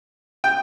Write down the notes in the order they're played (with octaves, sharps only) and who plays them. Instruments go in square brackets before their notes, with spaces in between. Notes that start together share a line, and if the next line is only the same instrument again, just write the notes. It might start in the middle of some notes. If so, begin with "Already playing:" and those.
[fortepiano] G5